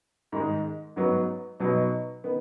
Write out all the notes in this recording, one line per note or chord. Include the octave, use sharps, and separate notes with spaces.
G#2 D#3 G#3
G#2 F#3 B3
B2 F#3 B3 D#4
D#3 B3